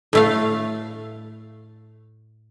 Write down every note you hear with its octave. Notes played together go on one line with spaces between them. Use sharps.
A2 A3 F5